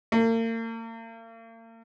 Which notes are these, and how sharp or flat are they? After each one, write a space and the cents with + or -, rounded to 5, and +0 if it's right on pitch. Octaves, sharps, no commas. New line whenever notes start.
A#3 -40